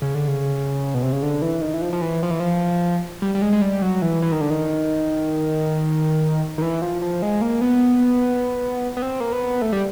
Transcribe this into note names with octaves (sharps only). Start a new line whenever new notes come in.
C#3
D3
C#3
B2
C3
C#3
D3
E3
D#3
E3
F3
F3
E3
F3
E3
F3
G3
G3
G#3
G#3
G3
F#3
E3
E3
D#3
D3
D#3
D#3
E3
F3
F3
G#3
A#3
B3
B3
C4
A#3
B3
A3
G3